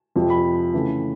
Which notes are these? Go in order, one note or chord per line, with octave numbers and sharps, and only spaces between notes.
F2 C3 F3
B5
C#3 E3 A3